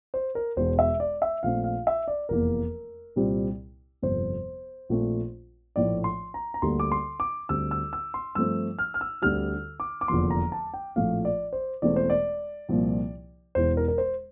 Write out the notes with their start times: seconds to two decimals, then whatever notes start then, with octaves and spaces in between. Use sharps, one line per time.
0.14 C5
0.35 A#4
0.56 E1 E2 E3 C5
0.79 E5
1.00 D5
1.22 E5
1.43 A#1 A#2 A3 C4 F5
1.64 F5
1.87 E5
2.08 D5
2.29 F1 E2 E3 A#3 A#4
3.16 C2 A#2 G3 C4
4.02 G1 F2 C3 C5
4.89 A#1 A#2 A3 C4
5.76 A#1 A2 F3 A3 D5
6.04 C6
6.34 A#5
6.54 A#5
6.62 D2 D3 G3 A#3 C6
6.80 D6
6.92 C6
7.20 D6
7.49 D2 D3 G3 C4 E6
7.71 E6
7.93 E6
8.14 C6
8.35 G2 F3 A3 C4 E6
8.79 F6
8.94 F6
9.01 E6
9.22 D2 D3 G3 C4 F6
9.80 D6
10.01 D6
10.08 F1 E2 D3 F3 A#3 C6
10.31 A#5
10.52 A5
10.74 G5
10.96 A#1 A2 F3 A3 C4 F5
11.25 D5
11.53 C5
11.82 E1 E2 E3 A3 C4 D5
11.96 C5
12.10 D5
12.69 C2 A#2 F3 A#3
13.55 E1 E2 E3 C5
13.77 A#4
13.88 A#4
13.98 C5